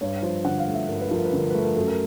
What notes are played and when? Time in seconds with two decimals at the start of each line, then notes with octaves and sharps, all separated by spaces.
0.01 G2 C#5
0.23 F3 C5
0.45 D3 F#5
0.59 F5
0.67 A3
0.74 E5
0.88 G2 A#4
1.01 B4
1.11 F3 A#4
1.25 B4
1.33 D3
1.38 A#4
1.50 A3 B4
1.63 A#4
1.76 F#2 A4
1.88 A#4